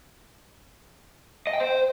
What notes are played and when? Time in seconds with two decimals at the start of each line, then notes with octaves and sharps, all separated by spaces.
1.47 D#5
1.53 G5
1.60 C5